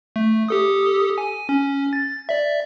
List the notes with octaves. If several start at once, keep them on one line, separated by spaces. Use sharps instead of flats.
A3
G4 A4 D#6
G#5
C#4
A6
D5 E5